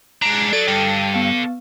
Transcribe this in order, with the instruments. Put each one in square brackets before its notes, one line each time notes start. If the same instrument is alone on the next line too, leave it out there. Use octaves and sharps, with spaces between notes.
[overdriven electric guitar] G#3 A#5 [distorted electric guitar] D4
[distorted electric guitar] F#3 [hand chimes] A4 [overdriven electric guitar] D5
[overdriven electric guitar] G2 [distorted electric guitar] A4 D5 [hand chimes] G5
[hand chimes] B3 F5